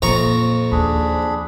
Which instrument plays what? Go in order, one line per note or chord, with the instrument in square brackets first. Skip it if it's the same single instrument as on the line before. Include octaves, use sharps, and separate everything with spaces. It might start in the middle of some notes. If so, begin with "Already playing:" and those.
[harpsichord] F2 A#5 C#6 [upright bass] A#2
[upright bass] D#2 [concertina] D4 G#4 B5